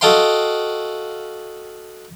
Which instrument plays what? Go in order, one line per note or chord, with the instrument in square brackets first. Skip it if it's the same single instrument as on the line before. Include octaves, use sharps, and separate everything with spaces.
[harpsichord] F#4 A4 D#5 F5 G5 C6